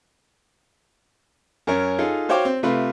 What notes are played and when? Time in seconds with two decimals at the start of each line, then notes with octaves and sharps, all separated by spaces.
1.67 F#2 C#4 A#4 C#5
1.99 D#4 F4 G#4 A4
2.29 F#4 C5 C#5 F5 G5 D6
2.45 C4
2.63 C3 A3 F4 B4